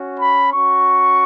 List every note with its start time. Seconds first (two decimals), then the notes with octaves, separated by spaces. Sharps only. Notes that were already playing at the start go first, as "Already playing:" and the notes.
Already playing: C#4 F#4
0.19 B5
0.52 C#4 F#4 C#6